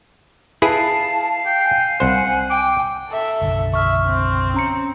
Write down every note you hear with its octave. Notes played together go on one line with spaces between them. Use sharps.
E4 G#4 B4 F5 A5
G5
G#5
C2 C5 F#5
G5 D6
A4 E5
F#1 B1 D3
E5 C#6 F6
C4
C#4 A#5 C#7